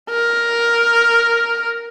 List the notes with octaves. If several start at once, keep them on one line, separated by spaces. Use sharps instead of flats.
A#4